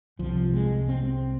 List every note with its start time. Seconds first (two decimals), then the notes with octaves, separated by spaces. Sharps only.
0.19 C2 C3 F3
0.54 G#3
0.89 C4